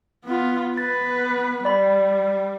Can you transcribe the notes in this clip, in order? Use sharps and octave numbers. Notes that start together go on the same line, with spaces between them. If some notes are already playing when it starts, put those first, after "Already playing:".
B3 F4
B3 B4 A6
G3 D5 B5